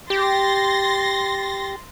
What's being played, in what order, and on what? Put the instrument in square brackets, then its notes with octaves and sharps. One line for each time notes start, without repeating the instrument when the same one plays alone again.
[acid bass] G4 [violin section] C6 A6 A#6